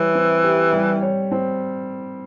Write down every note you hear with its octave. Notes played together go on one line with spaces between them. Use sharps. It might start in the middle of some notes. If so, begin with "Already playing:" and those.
Already playing: E3 G3 C#5
C4
G4
G3
C#5
C4